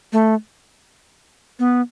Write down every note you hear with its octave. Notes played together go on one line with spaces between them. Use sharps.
A3
B3